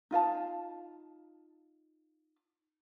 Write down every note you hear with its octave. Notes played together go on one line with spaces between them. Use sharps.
D#4 F4 F5 A5